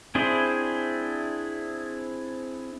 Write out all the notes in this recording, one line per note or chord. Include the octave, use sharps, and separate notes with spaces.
C4 D4 E4 G#4 C5